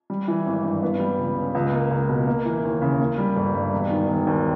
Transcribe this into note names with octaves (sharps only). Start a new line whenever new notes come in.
G3
E3
G#1
G2
B3
G3
C#2
C#3
C#2
A#3
C#2
B2
A#3
E3
D#2
C#3
A#3
G3
G1
G2
E1
D#3
E1
D#2